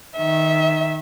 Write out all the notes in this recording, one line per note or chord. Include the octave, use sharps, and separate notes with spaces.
D#3 E5